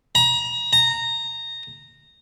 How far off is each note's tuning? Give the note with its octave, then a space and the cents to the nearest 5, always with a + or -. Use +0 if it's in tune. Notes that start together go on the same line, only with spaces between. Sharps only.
A#5 +30
A#5 -15